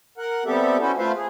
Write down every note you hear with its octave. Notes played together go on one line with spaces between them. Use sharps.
A#4 F#5
G3 B3 C4 G4 A4 E5
C#4 E4 F#4 A4 C5
A3 F4 B4 C5 E5 F5
G#4